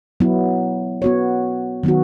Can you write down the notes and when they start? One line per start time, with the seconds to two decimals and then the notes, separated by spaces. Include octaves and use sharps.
0.20 F#3 B3 E4
1.02 B3 F#4 C#5
1.83 D#3 F#3 B3 F#4